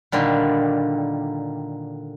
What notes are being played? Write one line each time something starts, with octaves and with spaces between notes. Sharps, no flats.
A#2 D3 D#3 G3